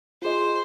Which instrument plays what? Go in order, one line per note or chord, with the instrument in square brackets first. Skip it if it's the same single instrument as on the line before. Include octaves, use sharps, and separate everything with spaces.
[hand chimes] F4 G#4 D#5 [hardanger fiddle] C5